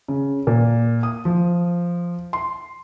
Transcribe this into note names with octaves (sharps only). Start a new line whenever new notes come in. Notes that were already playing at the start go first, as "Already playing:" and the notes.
C#3
A#2
D#6
F3
C6